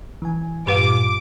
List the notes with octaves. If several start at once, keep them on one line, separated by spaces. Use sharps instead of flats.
E3 G#5
G2 A#2 G4 B4 F5 D6